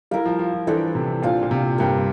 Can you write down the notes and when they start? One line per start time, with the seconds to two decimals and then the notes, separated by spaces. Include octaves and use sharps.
0.11 G3 E4 A#4 F5
0.26 F3
0.39 F3
0.53 F3
0.67 E3 D4 A4 C5 E5
0.95 C3
1.22 A#2 D4 F4 C5 F5
1.43 A#2
1.51 C3
1.78 G2 A#3 D4 G4 C5